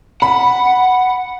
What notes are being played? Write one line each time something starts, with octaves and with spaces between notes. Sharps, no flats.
F#5 B5